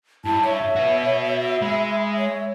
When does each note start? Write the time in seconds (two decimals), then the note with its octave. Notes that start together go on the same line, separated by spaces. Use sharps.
0.25 G2 E4 A5
0.44 C#5 E5
0.76 F#4 B4
1.62 G#3 B5
2.17 C#5